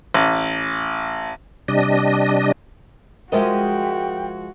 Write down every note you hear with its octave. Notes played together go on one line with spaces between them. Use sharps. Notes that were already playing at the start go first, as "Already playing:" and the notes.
A1
C3 G3 D4 D#5
F3 G#3 F#4 A#4 C5 D#5 E5 G5